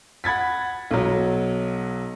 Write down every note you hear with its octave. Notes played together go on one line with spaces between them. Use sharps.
F#5 B5 G#6 A6 B6
B1 F#3